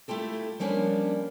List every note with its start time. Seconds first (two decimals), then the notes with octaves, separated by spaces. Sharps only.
0.08 A3 E4 F4 G4 A4
0.59 F3 G3 A#3 C#4 D4